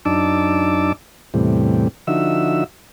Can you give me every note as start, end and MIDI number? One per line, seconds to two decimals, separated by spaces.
0.05 0.92 42
0.05 0.92 62
0.05 0.92 63
0.05 0.92 81
0.05 0.92 86
0.05 0.92 88
1.34 1.88 40
1.34 1.88 45
1.34 1.88 48
1.34 1.88 55
2.07 2.64 50
2.07 2.64 53
2.07 2.64 63
2.07 2.64 66
2.07 2.64 76
2.07 2.64 88